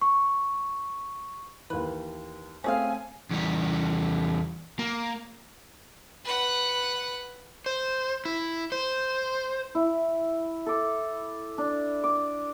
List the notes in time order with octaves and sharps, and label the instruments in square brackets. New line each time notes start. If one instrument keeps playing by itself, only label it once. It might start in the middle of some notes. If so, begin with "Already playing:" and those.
[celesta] C#6
[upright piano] D#2 E3 [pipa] B4
[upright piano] A3 C4 [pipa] C#4 G#4 F5 [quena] G#5
[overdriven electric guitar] E2 G3
A#3
[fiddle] B4 F#5
[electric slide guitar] C5
E4
C5
[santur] E4
A4 D6
D4
D6